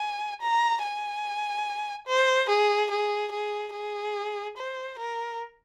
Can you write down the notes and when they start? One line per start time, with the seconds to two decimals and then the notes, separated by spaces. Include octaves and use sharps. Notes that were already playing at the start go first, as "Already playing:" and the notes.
Already playing: G#5
0.42 A#5
0.83 G#5
2.07 C5
2.49 G#4
2.91 G#4
3.32 G#4
3.73 G#4
4.57 C5
4.99 A#4